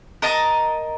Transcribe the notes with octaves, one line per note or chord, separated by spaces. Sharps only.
A#4 D#5 A5 A#5